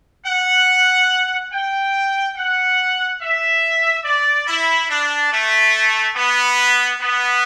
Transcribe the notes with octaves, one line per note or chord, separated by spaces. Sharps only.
F#5
G5
F#5
E5
D5
E4
D4
A3
B3
B3